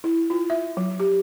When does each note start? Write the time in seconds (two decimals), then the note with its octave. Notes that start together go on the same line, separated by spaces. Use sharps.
0.04 E4
0.30 F4
0.50 E5
0.77 F#3
1.00 G4